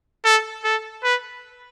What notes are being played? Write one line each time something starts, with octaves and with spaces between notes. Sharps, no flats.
A4
A4
B4